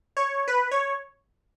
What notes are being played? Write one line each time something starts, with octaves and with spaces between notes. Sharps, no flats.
C#5
B4
C#5